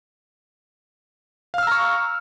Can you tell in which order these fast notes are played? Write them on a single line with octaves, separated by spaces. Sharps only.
F5 F6 E6 A#5 C#6